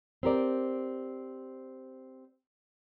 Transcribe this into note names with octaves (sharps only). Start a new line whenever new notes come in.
C4 G4 A#4 D5